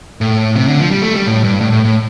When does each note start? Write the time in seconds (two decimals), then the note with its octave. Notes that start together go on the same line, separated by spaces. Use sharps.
0.21 A2
0.55 C3
0.68 D3
0.80 F3
0.91 G3
1.02 A3
1.14 G3
1.26 A2
1.44 G2
1.61 A2
1.72 A2
1.85 A2